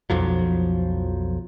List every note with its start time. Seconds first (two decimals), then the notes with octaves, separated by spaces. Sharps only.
0.10 B1 F2 F3 F#3